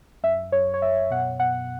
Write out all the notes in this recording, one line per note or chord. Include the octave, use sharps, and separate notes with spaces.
F#2 E5
F#2 C#5
C#5
F#2 E5
B2 F#5
B2 F#5